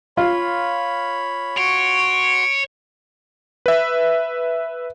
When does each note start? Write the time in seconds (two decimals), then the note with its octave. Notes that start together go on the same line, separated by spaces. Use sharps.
0.17 F4 C#5 B5
1.57 F#4 C#5 C6 D7
3.66 B4 E5